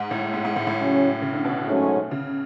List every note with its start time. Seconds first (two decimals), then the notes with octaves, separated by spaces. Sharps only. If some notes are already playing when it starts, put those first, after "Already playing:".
Already playing: G#2
0.11 A2
0.34 G#2
0.45 G#2
0.56 A2
0.67 A2
0.78 C#3 F#3 C#4
1.22 C#3
1.33 D3
1.45 B2
1.66 G#2 F#3 A3 C#4 F#4
2.11 C#3